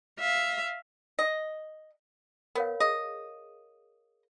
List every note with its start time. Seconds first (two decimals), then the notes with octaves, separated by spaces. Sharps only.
0.20 E5 F5
1.19 D#5
2.55 B3 A#4 C#5 F5
2.80 G#4 D#5